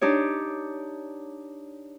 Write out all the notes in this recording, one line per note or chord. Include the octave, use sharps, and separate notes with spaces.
D4 D#4 G4 C#5